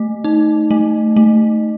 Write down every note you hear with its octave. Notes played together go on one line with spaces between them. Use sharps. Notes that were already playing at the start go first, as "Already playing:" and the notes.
Already playing: A3
D#4
A3
A3